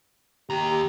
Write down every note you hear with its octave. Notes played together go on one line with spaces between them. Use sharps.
D#2 G4 A#5